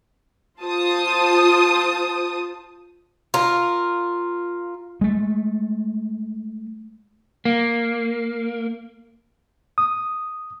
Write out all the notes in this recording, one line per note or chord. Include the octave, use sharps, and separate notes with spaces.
F4 C5 A5 D#6
F4 A#4
G#3 A3
A#3
D#6